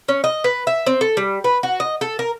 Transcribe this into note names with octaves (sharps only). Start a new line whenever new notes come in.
C#4
D#5
B4
E5
C4
A4
G3
B4
F#4
D#5
A4
A#4